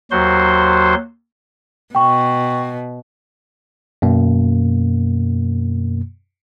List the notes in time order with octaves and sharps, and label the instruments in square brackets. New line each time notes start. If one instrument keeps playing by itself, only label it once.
[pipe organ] D#2 F#3 F#4 C5 C6
[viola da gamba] B2 [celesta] G5 C#6
[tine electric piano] F#2 B2 A#3